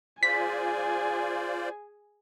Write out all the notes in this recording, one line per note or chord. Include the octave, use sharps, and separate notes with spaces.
F4 G#4 C5 D5 G#5 B6